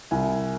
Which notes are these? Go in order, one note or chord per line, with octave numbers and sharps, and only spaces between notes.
C2 G#5